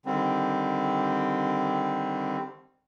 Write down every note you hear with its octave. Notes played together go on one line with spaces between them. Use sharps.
D3 D#3 G3 C4